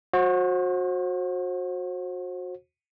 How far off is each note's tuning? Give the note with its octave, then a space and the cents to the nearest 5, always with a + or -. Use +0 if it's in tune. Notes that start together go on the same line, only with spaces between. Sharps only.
F#4 -25 C5 +35